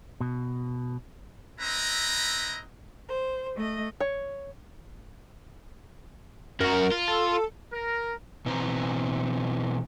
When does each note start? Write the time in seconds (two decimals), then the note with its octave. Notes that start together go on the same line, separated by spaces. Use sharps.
0.21 B2
1.60 C4 E4 B4 D#5 A#5
3.08 C5
3.55 A3 D#5
4.00 C#5
6.61 F#2 F#4 A#4
6.92 F4
7.08 A4
7.73 A#4
8.46 B2 E3 C4 B4 C5 A#5